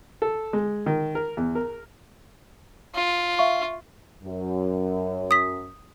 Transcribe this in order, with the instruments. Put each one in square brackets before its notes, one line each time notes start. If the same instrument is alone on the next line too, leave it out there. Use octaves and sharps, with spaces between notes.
[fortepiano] A4
G#3
D#3
A#4
E2
A#4
[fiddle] F4
[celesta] E5 F5 C#6
[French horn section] F#2
[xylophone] D#6 B6